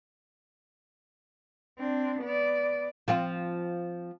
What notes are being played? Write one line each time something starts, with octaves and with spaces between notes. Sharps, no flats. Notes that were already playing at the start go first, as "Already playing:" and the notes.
C4 D4
B3 D5
F3 C4 F4